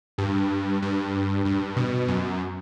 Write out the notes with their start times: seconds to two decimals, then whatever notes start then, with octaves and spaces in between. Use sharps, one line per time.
0.18 G2
0.82 G2
1.45 G2
1.76 B2
2.08 F#2